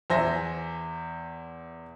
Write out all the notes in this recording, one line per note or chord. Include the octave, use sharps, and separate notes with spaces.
E2 C5 E5 G#5 A#6